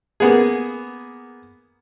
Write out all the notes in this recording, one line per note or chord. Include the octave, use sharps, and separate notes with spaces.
A#3 B3 G#4